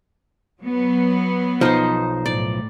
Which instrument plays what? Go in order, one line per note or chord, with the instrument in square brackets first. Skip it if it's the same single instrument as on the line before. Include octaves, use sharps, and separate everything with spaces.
[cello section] F#3 B3
[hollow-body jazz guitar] B1 F3 [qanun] D#4 C5
[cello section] A2 [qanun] D5